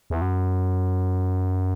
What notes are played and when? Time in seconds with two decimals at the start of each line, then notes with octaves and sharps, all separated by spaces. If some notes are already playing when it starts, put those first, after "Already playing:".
0.10 E2
0.22 F#2